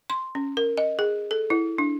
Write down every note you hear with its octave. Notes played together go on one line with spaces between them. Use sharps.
C6
C#4
A#4
D#5
G#4
A4
E4
D4